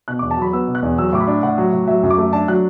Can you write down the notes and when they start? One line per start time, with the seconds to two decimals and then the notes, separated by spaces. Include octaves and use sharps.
0.08 B2 F#6
0.19 E2 D6
0.31 A5
0.38 F#3 B5
0.53 B3 E6
0.67 B2
0.75 F#6
0.83 E2
0.98 F#3 E6
1.13 A2 D6
1.20 B5
1.27 D4
1.43 A2 F#5
1.58 F#3
1.73 A2
1.87 F#3 E5
2.03 F#2
2.11 D6
2.18 A3
2.33 D4 A5
2.48 F#3 F#6